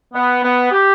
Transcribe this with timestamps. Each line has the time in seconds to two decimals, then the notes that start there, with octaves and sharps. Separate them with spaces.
0.14 B3
0.44 B3
0.71 G4